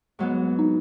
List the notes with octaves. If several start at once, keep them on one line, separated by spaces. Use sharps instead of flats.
G#2 F#3 B3
D#4